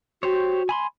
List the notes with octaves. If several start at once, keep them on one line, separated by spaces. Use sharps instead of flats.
F#4 G4 C5 C#5
G#5 B5 C6